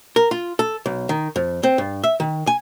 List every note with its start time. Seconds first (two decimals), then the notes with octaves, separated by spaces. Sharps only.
0.16 A#4
0.31 F4
0.59 A4
0.86 B1
1.09 D#3
1.36 F2
1.63 C4
1.78 G2
2.04 E5
2.20 D#3
2.47 G#5